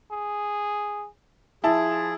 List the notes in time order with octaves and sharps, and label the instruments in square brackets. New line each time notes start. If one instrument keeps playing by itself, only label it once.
[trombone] G#4
[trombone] F3 [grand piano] E4 A5 [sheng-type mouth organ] G#4